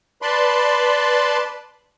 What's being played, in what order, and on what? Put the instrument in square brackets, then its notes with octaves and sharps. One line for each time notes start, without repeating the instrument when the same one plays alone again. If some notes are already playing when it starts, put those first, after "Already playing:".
[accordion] B4 D5 A5 B5 C6